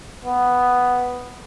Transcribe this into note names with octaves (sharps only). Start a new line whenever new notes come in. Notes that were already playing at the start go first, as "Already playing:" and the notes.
B3